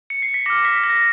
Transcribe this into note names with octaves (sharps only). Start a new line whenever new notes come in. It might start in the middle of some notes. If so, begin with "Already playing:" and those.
C#7
C7
B6
D6 F6 A#6
B6
A#6